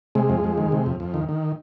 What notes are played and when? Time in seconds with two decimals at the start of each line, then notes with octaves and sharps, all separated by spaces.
0.15 C3 G#3
0.30 F2
0.44 F2
0.58 D#3
0.72 C3
0.86 F2
1.00 F2
1.14 D#3
1.29 D#3